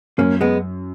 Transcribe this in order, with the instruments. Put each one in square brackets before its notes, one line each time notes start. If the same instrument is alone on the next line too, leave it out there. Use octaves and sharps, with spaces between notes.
[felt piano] F#2 [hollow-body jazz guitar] A#3 C#4
[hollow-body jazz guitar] G#3 B3